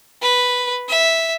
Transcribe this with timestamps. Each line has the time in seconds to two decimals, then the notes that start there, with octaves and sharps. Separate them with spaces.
0.22 B4
0.89 E5